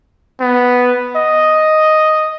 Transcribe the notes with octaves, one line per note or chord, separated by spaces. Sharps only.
B3
D#5